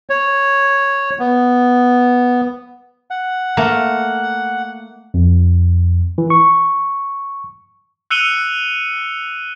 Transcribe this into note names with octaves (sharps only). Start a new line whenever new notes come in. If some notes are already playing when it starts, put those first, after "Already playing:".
C#5
B3
F#5
A3 A#3
F2
E3
C#6
E6 F#6 C#7 D#7 F7 G7